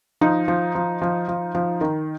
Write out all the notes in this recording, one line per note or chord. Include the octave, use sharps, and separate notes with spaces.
F3 D#4
F3
F3
F3
F3
F3
D#3